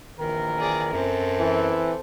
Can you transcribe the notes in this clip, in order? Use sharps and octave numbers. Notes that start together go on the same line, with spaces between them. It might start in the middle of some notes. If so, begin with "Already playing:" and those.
A#1 D#3 E3 A#4
G#4 D5
F#2 C4 A4
E3